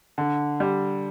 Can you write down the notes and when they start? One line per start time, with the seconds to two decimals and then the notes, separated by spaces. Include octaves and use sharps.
0.18 D3
0.60 G3